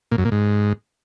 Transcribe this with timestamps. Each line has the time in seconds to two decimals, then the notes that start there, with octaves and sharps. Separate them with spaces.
0.11 A#2
0.18 F#2
0.25 A#2
0.32 G#2